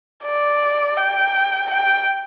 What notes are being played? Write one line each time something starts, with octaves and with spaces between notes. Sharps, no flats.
D5
G5
G5